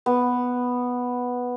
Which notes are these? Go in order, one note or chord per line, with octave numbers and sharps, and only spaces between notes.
B3